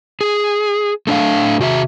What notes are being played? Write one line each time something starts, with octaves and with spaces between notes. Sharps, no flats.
G#4
A3 D4 D5 F5
C3 F#4 C5 E5